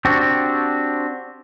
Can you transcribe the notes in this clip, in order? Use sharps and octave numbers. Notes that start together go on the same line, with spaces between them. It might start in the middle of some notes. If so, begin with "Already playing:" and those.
C4 D4 F#4 G4